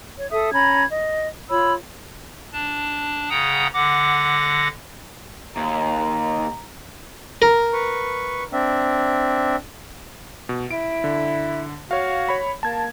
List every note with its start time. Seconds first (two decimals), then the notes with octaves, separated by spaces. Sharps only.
0.17 C#5
0.31 A4 E5 D#6
0.53 C#4 A#5 B5 G#6
0.90 D#5
1.50 F4 C#5 B5 E6
2.53 D4 A5
3.30 C#3 F#5 G5 A#5 D#6
3.74 D3 F#5 D6 A#6
5.57 D#2 A#5
7.42 A#4
7.73 B4 C#6
8.53 C4 D4 E5
10.49 B2
10.71 E4 D7
11.04 D3
11.91 F#4 C#5 F5
12.29 C#5 B5
12.63 A#3 A5 G#6